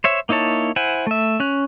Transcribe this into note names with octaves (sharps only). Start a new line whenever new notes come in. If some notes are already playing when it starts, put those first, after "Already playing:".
C5 C#5 E5
A#3 D#4 E4 C#5 A5
E4 C5 F#5 G#5
A3 E5
C#4 F#6